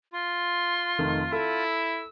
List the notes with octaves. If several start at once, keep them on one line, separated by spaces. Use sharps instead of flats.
F4 C6
F1 D#3 A3
E4 A4
E6